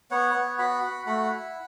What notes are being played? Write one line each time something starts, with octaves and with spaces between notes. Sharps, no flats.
B3 C#5 F#5
B3
F#4 F#5 B5
F#4
A3 F#5 B5
E4